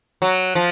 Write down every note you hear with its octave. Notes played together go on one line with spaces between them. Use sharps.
F#3
F3